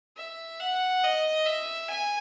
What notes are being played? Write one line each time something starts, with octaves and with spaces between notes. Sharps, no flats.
E5
F#5
D#5
E5
G#5